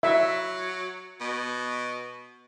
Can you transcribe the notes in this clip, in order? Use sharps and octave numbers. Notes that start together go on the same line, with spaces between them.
F#3 E5
B2